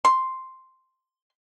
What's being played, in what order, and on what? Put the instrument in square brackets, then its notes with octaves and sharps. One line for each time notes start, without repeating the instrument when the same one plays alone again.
[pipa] C6